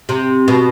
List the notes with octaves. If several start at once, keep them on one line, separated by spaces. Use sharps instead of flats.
C3
B2